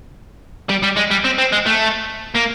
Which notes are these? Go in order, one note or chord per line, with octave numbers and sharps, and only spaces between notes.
G3
G3
G#3
G3
C4
C4
G#3
A3
A#3